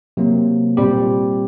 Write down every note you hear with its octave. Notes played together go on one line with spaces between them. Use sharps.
C3 F#3 A#3
A#2 G3 C4 G4